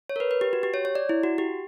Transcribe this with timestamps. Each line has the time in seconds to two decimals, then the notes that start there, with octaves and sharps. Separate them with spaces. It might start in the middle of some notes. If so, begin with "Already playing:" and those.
0.09 C#5
0.16 A#4
0.20 B4
0.31 B4
0.41 G4
0.53 F#4
0.63 G4
0.74 C#5
0.85 C#5
0.95 D5
1.09 E4
1.23 F#4
1.38 G4